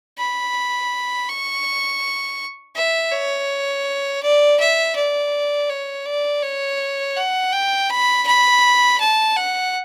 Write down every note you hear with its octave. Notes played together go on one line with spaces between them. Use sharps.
B5
C#6
E5
C#5
D5
E5
D5
C#5
D5
C#5
F#5
G5
B5
B5
A5
F#5